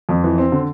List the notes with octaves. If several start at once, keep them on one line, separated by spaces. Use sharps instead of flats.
F2
E3
C4
D3